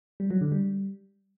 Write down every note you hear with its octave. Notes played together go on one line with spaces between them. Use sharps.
G3
F#3
D3
G3